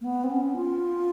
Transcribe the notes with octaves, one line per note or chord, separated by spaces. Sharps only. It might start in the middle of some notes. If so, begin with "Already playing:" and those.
A#3
B3
C4
C#4
F4